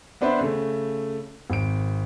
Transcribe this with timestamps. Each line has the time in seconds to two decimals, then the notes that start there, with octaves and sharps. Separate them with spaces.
0.21 B3 D4 B4 C5 D5 E5
0.41 C#3 A3
1.50 G#1 D7